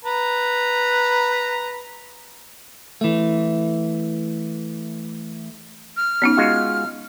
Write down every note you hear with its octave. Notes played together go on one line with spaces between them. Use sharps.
B4 A#5
E3 A3
F6
F#3 B3 C#4 D#4
G#3 F4 F#4